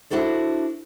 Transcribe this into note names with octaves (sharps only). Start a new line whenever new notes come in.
D4 E4 F#4 A4 C5